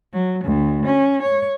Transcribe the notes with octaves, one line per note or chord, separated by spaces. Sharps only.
F#3
D2
C#4
C#5